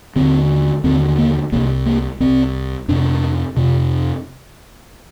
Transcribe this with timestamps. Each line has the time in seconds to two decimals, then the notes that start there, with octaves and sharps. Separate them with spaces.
0.16 D#2 D3 C4
0.84 D#2 D3 C4
1.18 A#3
1.52 C2 C3 A#3
1.86 A#3
2.20 C2 C3 C4
2.88 F2 C3 D4
3.57 F2 C3